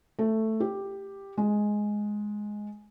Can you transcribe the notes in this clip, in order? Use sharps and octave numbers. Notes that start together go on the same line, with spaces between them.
A3
G4
G#3